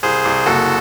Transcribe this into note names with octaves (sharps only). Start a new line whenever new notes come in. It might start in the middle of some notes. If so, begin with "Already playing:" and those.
C2 G#4 C5
C2
F#1 F#4 A4